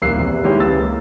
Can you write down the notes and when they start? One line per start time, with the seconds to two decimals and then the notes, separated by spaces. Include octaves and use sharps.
0.02 D#1 C2 A#3 E6 F#6 C7
0.18 E2 C3
0.44 D#3 G#3 E4 G4 C#5
0.60 C#2 E3 E6 A6
0.75 A#3